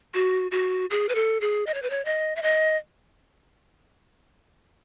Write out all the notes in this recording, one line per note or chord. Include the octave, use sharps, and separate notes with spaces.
F#4
F#4
G#4
B4
A4
G#4
D#5
C#5
B4
C#5
D#5
E5
D#5